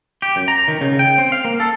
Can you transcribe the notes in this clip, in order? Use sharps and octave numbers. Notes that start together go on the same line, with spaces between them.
G4
F#2
A#5
D#3
C#3
G5
C4
F5
A#3
A4